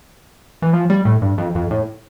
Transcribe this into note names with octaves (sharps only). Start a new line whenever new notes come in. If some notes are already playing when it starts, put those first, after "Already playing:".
E3
F3
G3
A2
G2
F2
F2
A2